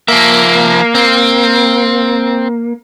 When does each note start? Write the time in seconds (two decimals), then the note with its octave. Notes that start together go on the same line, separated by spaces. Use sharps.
0.08 F3 A#3 E5
0.95 C4